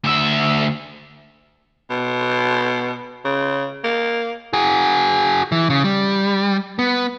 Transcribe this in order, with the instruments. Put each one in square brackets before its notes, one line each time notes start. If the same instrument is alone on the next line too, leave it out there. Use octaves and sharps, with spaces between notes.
[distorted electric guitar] D2 E5
[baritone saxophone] B2
C#3
A#3
[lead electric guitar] F#4 G#4
E3
C#3
G3
B3